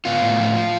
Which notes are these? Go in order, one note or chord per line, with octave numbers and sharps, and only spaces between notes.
B3 F4
A2
F3
F3